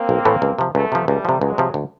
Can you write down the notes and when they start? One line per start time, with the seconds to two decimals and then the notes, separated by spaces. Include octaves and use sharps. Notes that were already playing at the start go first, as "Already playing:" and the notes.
Already playing: A#3 C4
0.09 B1
0.25 A2 E3 A3
0.42 C#2
0.59 C3 F3
0.75 C#2 A3 B3
0.92 C3 F3
1.08 C#2 G3 A3
1.25 C3 F3
1.41 C#2 F#3 G#3
1.58 C3 F3
1.74 D2